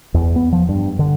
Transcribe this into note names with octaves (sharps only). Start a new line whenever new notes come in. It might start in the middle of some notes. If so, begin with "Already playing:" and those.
E2
B3
F3
G2
D3